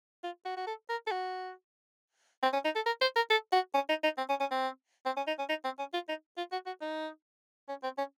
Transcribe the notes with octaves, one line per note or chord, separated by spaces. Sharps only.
F4
F#4
F#4
A4
A#4
A4
F#4
C4
C#4
D#4
A4
A#4
C5
A#4
A4
F#4
C#4
D#4
D#4
C4
C#4
C#4
C4
C4
C#4
D#4
C#4
D#4
C4
C#4
F4
D#4
F4
F#4
F#4
D#4
C#4
C4
C#4